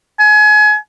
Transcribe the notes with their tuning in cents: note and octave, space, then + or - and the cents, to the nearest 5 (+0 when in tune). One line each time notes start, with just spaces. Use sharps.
G#5 +30